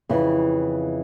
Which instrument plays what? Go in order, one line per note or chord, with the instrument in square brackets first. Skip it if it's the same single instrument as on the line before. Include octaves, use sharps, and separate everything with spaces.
[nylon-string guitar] F2 C#3 E3